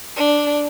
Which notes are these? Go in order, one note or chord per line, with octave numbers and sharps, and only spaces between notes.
D4